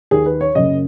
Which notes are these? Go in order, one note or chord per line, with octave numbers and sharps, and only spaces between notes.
D#2 D#3 G#4
B4
C#5
F#1 F#2 C#3 D#5